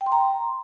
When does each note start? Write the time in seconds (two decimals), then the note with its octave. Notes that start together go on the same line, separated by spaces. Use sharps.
0.01 G5
0.06 C6
0.12 A#5